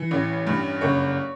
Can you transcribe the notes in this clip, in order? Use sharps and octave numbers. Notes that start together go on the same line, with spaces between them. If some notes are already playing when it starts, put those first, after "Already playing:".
Already playing: E3
A1
G2
F#1 C#5